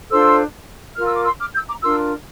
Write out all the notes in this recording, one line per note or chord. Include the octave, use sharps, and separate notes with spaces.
D4 F4 A4 C5 C6 E6
F4 A#4 F6
E6
D6
C6 E6
D6 F6
E6 G6
A#5 D6
D4 F4 A#4 C6 E6